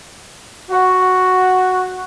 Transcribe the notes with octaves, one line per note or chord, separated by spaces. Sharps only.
F#4